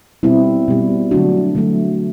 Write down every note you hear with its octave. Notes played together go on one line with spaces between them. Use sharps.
B2 G3 C4 E4
B2 G3
D3 F#3 A3 D4 F#4
D3 F#3 A3